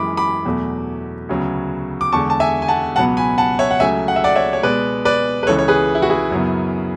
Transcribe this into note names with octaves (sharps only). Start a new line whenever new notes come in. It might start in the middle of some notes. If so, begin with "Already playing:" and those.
Already playing: F#2 E3 G#3 B5 D6
B5 D6
E2 B2 F#3 A3
D2 C#3 F#3 B3
D6
E2 D3 G#3 A5 C#6
A5
E5 G#5
G#5
F#5 A5
C#2 B2 F#3 B3 F#5 A5
G#5 B5
F#5 A5
C#5 E5
F#5
C#2 C#3 F#3 A3 E5 G#5
F#5
E5
D5 F#5
C#5 E5
C#5
B2 G#3 B3 B4 D5
B4 D5
B4
C#2 C#3 E3 A4 C#5
C#5
G#4 B4
E4
F#4
E4 G#4
F#2 C#3 F#3 B3